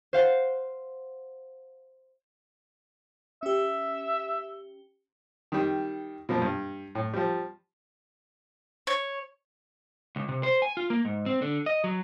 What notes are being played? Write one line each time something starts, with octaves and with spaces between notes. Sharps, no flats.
C5 F5 F#5
C#4 G4 E5
D#3 G3
B2 F3 A#3
G2
A2
F3 G3
C#5
C#2
C3
C5
G#5
F4
A#3
G#2
C4
D3
D#5
F#3